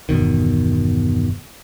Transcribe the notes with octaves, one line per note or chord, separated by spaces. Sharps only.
G1 E2 B2 D#3